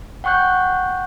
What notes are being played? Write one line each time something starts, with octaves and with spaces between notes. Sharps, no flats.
F#5 G5 C#6 F#6 G6